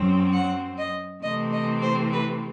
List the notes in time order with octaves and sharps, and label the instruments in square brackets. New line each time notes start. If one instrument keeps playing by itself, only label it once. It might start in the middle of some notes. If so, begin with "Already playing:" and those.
Already playing: [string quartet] F#2 F#3 C4
F#5
D#5
C3 E3 A3 C4 D#5
D#5
C5
B4